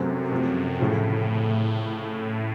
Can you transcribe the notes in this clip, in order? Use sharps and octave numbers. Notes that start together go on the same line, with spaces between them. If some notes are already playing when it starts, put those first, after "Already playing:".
Already playing: F#2 C3 F#3 A3 C4
C3 F3 A3
A2 C#3 F3 A3 C#4